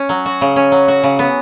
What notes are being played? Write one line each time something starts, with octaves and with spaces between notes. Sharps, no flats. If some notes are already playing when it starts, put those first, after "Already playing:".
Already playing: C#4
F#3
F#4
C#3
C#4
F#3
F#4
C#3
B3